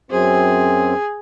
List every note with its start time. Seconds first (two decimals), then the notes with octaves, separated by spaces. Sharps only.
0.11 F#2 C4 G#4